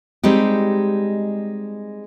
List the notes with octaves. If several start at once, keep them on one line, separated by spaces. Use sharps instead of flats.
G3 G#3 C4 D#4 G4